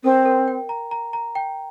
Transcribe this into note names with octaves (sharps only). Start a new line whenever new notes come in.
C4 A#4
A#4
G5
A#5
A#5
A#5
G5